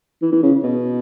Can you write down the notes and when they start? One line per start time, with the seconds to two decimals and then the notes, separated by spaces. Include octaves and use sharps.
0.22 E3
0.32 E3
0.43 C#3
0.63 B2